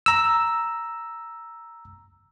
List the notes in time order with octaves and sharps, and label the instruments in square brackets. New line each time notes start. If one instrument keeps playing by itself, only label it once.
[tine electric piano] A#5 E6